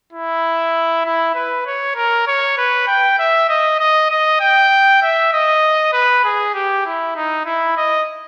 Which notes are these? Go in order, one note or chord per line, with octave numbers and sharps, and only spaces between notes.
E4
E4
B4
C#5
A#4
C#5
B4
G5
E5
D#5
D#5
D#5
G5
E5
D#5
B4
G#4
G4
E4
D#4
E4
D#5